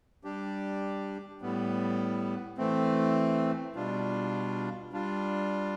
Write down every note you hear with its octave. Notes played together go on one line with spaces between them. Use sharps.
G3 D4 G4
A2 G3 B3
E3 A3 C4
B2 G3 D4 F4
G3 D4 F4